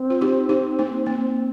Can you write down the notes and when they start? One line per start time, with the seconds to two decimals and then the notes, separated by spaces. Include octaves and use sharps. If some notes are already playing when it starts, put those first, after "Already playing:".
Already playing: C4
0.10 F4
0.21 D#4 G4
0.49 D#4 G4
0.79 A#3 D#4
1.06 A#3 C4